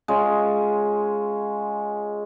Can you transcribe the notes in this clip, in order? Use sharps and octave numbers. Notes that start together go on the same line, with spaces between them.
G#3 C#4 F4